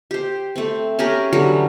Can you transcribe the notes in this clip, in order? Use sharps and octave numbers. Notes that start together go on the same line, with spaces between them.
G4 C5
A3 C4
C#4 G4 G#4 A#4
D3 E3 F#3 G3